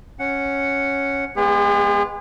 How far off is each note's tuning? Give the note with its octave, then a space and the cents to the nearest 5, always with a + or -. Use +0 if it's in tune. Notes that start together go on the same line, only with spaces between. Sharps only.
C#4 +0 F#5 +0
G#3 +0 B3 +0 G#4 -45